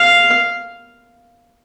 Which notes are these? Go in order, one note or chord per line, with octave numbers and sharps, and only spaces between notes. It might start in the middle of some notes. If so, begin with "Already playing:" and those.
Already playing: F5